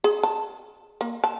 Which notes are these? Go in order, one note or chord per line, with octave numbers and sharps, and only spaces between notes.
G#4
A5
A#3
A5